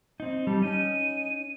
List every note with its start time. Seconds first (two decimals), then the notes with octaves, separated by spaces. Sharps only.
0.20 C4 D#4
0.47 G3 A5
0.62 C#4 D#4 D#7